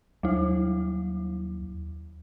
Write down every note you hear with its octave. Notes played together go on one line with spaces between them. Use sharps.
D#2 F#3 G3 E4